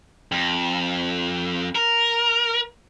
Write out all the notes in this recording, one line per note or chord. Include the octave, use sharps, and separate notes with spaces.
F2
A#4